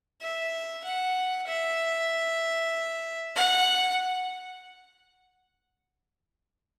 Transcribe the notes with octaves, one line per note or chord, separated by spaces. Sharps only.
E5
F#5
E5
F#5